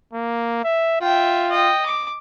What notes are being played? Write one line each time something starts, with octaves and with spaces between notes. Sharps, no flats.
A#3
E5
F4 E5 G5
D#5 G5
D6